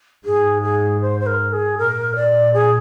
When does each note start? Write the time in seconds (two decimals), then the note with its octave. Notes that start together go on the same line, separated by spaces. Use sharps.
0.25 G#2 G#4
0.63 G#4
1.02 C5
1.20 C5
1.27 A#4
1.53 G#4
1.78 A#2 A#4
2.16 D5
2.54 G#4